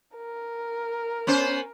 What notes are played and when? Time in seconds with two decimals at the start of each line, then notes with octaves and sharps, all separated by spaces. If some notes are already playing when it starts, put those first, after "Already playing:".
0.16 A#4
1.27 B3 C#4 C5